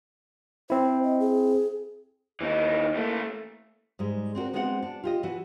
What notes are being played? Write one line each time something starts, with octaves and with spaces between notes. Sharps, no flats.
C4 E4 C5
D#5
G#4
D#2 E3 D#4
E3 A3 A#3
G#2 G3 G#3
C4 D4 F#4 A#4
G#3 B3 C4 F#4 C5 F#5
D4
F4 G4 D#5
E3 F#4